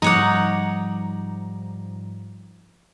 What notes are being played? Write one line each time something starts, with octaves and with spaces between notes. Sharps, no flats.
G#2 F3 G3 D#4 C#5 F#5 A#5 D6